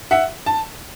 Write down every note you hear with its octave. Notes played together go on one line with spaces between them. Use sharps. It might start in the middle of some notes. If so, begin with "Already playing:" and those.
E5 F#5
A5